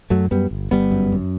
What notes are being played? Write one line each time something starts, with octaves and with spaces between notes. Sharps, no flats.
F#2 F#3 A3
F#2 G3 B3
G1
G1 G3 B3
F#2
F#2